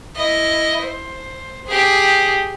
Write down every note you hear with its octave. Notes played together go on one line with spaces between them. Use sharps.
E4 D#5
C5
G4 G#4